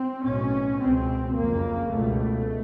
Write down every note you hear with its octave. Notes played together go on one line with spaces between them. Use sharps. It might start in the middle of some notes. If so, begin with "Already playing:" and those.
Already playing: C4
B1 A2 C#4
C#2 B2 C4
F#1 F2 C#3 A#3
C#2 B2 A3